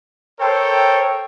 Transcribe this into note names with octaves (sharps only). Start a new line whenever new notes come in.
A4 A#4 C5 C#5 G5